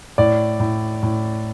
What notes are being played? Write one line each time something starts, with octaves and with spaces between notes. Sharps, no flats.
A2 D5
A2
A2